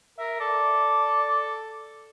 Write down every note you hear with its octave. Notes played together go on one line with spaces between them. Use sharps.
A#4 E5
A4 D5